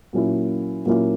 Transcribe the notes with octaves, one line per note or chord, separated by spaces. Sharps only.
A#2 F#3 A#3 C#4 E4
A#2 F#3 A#3 C#4 E4